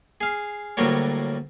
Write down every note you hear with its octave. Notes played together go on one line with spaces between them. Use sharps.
G#4 F5
D2 A2 F#3 G3 A#3 C#5